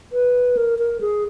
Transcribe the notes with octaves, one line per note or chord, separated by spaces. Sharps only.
B4
A#4
A#4
G#4